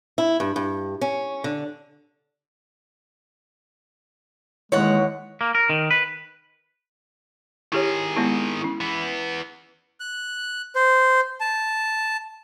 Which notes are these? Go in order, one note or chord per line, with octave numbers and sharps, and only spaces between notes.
E4
G2
G2
C#4
D3
D#2 E3 G#3 C#5 F#5
A#3
A#4
D#3
B4
D#3 E4 G4 G#4 C#5
G#3 B3 E4
C#4 E4
E3 B3
F#6
C5
A5